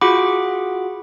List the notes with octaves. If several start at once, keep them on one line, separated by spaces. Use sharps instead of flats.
F4 F#4 G#4 F#5 B5 D6